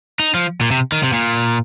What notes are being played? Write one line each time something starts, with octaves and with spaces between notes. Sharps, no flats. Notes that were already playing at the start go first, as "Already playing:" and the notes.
D#4
F3
A#2
C3
D#3
C3
A#2